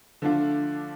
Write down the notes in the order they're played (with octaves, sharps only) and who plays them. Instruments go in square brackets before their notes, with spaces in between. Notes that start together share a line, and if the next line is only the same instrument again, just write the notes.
[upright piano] D3 F3 A3 D4 F4